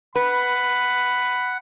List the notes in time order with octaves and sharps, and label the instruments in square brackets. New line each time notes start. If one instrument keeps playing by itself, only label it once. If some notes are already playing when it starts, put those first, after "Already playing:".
[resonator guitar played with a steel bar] B4 [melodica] F#5 [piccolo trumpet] B5